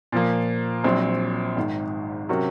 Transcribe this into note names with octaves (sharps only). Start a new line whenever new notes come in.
A#2 F3 A#3
A#1 A#2 F#3 C4
G#1 G#2 D#3
C3 F#3 C#4 F#4 A#4